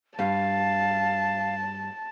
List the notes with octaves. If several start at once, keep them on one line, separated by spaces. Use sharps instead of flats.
G2 F5 A5